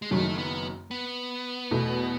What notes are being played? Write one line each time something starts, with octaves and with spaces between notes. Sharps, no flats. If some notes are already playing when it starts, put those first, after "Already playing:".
G#3
F#1 F#2 D#3 F#3 A3
B3
B3
E2 B2 A3